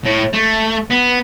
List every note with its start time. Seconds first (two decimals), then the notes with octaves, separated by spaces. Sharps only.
0.05 A2
0.33 A3
0.90 B3